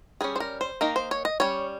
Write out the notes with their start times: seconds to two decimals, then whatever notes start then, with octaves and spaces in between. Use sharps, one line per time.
0.21 G3 C#4 G#4
0.36 C5
0.40 A#4
0.61 C5
0.81 D#3 A#3 D#4 A#4
0.96 C5
1.11 C#5
1.25 D#5
1.40 G3 C#4 C#5